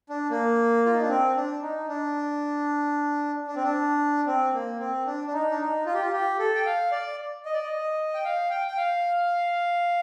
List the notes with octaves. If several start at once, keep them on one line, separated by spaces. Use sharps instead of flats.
D4
A#3
F4
D#4
D4
C4
D4
D#4
D4
D4
C4
D4
C4
A#3
C4
D4
D4
D#4
D4
D#4
F4
G4
F4
G4
A4
G5
F5
D5
D#5
D5
D#5
G5
F5
G5
G5
F5